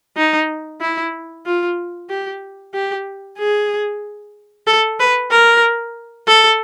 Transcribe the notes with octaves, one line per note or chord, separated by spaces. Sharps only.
D#4
E4
F4
G4
G4
G#4
A4
B4
A#4
A4